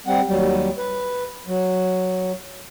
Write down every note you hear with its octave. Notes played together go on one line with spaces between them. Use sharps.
G3 C4 F#5
D#2 F#3 G3
B4
F#3